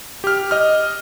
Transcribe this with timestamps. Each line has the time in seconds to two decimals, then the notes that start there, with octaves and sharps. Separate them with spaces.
0.24 G4 F6
0.51 D#5 F6